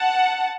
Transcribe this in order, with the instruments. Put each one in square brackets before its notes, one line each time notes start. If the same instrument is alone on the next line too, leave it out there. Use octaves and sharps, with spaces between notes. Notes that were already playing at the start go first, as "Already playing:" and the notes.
Already playing: [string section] F#5 A5